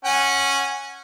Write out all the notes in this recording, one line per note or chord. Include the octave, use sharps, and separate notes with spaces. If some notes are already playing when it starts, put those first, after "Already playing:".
C#4 F#5 G#5